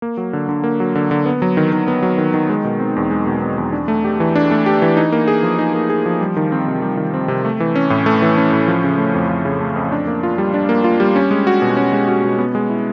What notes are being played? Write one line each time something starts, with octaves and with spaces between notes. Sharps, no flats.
A#3
F#3
D3
D3
A#3
F#3
D3
D3
B3
F#3
D#3
D#3
B3
F#3
D#3
D#3
G#3
B2
C4
E2
G#3
B2
C4
E2
D4
A3
G4
E3
D4
A3
G4
E3
D#4
A#3
G#4
F3
D#4
A#3
G#4
F3
G3
D#3
C4
C3
G3
D#3
C4
C3
A3
E3
C#4
A2
A3
E3
C#4
A2
F3
C#3
A3
F2
F3
C#3
A3
F2
D4
A#3
F4
G3
D4
A#3
F4
G3
C#4
G#3
F#4
B2
C#4
G#3
F#4
B2
B3
G#3
E4